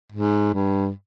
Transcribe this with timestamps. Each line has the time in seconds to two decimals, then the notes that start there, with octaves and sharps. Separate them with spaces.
0.12 G#2
0.53 G2